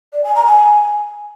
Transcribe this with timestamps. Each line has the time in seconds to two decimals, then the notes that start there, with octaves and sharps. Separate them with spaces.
0.12 D5
0.23 G#5
0.34 A#5
0.46 G#5